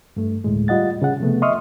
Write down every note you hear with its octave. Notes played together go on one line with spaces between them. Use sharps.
G2 A3
D2 A2 G#3
G3 F4 D#5 F#5 A6
C#3 G#4 F#5
C3 F3 A3 B3
D#5 E5 C6 C#6 D#6 F6